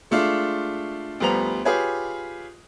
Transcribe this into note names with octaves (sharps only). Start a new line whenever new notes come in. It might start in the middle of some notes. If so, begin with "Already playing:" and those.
G#3 A3 D4 F4
D2 F3 G3 B3 A#5 F7
F4 G4 G#4 B4 C#5